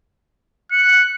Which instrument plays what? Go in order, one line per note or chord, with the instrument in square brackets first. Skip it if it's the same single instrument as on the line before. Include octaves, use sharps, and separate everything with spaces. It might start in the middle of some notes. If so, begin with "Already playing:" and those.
[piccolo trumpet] F#6 [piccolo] C#7